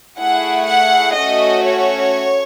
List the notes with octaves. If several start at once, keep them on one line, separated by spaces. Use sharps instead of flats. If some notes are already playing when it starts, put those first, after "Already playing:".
A3 E4 G#4 F#5
F#5
A3 C#4 F#4 A4 D#5
C#5